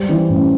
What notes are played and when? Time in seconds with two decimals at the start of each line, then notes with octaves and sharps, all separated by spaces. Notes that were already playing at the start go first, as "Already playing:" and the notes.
Already playing: G3 C5
0.09 E3
0.29 A1